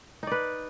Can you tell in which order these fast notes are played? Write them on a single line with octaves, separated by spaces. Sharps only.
D#4 D5 B4